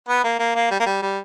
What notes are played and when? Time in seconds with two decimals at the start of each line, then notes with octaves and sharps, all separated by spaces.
0.09 B3
0.24 A#3
0.40 A#3
0.56 A#3
0.71 G3
0.80 A#3
0.86 G3
1.02 G3